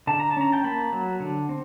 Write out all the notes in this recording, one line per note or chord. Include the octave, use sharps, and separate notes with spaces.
D3 A5
A#5
A5
C#4 A#5
G5 A5
A#3 A5 B5
F#3
D3
C4